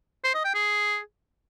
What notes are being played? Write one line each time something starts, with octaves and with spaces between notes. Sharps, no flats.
C5
D#5
G5
G#4